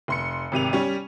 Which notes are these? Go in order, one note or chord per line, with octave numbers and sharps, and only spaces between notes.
F1 C6 C#7
G#1 C3 D#7 F7
G3 C#4